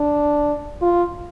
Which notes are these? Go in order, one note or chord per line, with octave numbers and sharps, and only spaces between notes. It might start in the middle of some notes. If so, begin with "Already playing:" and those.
Already playing: D4
F4